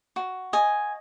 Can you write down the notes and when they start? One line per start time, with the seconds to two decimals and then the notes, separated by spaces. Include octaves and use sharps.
0.16 F#4
0.53 D#5 G#5